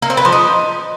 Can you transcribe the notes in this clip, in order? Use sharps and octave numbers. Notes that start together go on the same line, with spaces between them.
A#3
C4
B4
F3
D#4